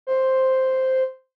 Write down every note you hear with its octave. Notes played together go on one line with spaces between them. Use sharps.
C5